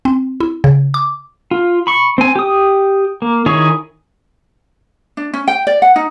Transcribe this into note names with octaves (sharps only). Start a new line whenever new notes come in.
C4
E4
C#3
D6
F4
B5 C#6
C4 G#5
G4 D#6
A#3
D#3 E4 G#4 C#5
D4
C#4
G5
D5
F#5
D#4